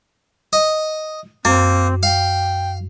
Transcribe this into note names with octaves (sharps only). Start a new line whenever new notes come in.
D#5
F#2 A#3 C4
F5 G5